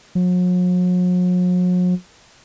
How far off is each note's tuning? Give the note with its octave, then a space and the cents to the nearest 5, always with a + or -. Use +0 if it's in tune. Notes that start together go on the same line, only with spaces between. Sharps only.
F#3 -45